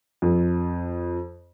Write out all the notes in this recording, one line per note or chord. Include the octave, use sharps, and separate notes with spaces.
F2